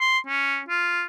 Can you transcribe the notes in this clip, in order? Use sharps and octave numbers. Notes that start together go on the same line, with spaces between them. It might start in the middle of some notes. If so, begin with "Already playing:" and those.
C6
C#4
F4